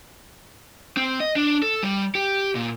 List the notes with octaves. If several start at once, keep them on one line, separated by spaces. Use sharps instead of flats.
C4
D#5
D4
A4
G3
G4
A#2